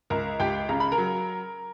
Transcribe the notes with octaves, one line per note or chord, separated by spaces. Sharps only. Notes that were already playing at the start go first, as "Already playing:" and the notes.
C#2 A#4 A#5
C#2 G4 G5
C#3 A#5
B5
A#4 A#5
F#3